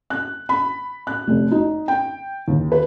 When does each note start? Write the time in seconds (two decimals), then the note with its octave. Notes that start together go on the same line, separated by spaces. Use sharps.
0.10 F#6
0.49 B5
1.07 F#6
1.27 F1
1.51 D#4
1.88 G5
2.48 D#2
2.72 B4